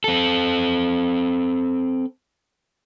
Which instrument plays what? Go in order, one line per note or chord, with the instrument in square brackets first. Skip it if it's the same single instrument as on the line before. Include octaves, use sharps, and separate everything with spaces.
[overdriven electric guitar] C4 A4